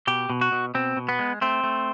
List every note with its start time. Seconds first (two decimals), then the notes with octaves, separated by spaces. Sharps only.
0.07 B2 G4
0.30 B2
0.41 F#4
0.52 B2
0.75 B2 C4
0.97 B2
1.09 B3
1.19 G#3
1.41 A3 C4
1.64 A3